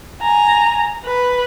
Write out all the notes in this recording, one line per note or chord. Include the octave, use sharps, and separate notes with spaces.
G#5 A#5
B4